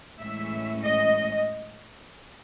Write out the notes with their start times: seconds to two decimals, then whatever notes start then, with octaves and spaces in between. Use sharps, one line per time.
0.19 A2 E3 G#3 C#4 E5
0.87 D#5